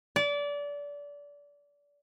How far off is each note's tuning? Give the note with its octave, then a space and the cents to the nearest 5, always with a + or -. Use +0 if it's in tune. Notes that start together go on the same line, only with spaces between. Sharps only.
D5 -25